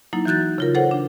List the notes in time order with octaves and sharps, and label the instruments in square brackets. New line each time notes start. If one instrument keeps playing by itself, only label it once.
[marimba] F#3 A#3 D#4 E4
E3 F#3 F#4 F#6 G6 A6
C#3 F4 A#4
A4 C5 C#5 F#5
D4